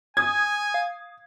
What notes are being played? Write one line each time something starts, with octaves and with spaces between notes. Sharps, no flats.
G#5 D#6 G#6
F5